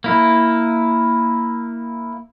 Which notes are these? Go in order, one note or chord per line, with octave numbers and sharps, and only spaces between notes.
A#3 E4